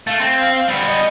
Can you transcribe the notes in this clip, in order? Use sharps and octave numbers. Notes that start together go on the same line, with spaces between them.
A3 F5
C4
G3 B3
D#5